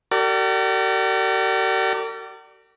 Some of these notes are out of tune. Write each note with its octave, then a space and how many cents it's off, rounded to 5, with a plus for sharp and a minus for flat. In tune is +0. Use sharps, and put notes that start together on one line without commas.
G4 -45 A#4 -45 D5 +0